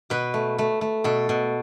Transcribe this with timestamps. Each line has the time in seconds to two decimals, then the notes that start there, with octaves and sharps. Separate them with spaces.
0.10 B2 B4
0.34 A3
0.58 A3
0.81 A3
1.04 B2 A4
1.29 B2